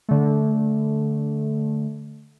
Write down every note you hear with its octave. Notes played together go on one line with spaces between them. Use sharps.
D3 A3